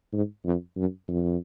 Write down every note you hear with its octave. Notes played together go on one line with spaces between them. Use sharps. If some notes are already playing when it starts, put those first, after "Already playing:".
G#2
F2
F#2
F2